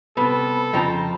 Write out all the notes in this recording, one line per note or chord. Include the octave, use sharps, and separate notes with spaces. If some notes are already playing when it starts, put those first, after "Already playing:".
C3 G3 B3 A4
F2 C#3 F3 G5 A5 A#5